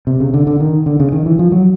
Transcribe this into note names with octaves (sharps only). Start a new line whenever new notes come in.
C3
C#3
D3
D3
D#3
D3
C#3
D#3
E3
F3
F#3